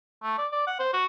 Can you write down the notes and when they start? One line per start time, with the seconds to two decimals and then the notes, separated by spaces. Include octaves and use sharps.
0.23 A3
0.38 D5
0.52 D5
0.67 F#5
0.79 C5
0.93 F#4